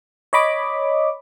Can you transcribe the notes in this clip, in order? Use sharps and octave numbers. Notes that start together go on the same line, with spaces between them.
C#5 D#5 B5 D6